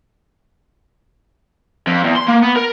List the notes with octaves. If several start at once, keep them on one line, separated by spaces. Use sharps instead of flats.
F2
E2
C6
A#3
B3
A#4